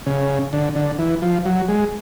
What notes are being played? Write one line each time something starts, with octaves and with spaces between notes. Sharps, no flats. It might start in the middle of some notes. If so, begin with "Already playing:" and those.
C#3
D3
D3
E3
F3
F#3
G#3